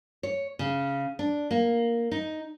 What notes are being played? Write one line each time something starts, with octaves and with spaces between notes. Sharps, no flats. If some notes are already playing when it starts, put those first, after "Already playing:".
C#5
C#3
D4
A#3
D#4